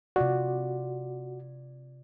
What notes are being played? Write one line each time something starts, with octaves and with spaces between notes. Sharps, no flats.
C3 F4 F#4 D5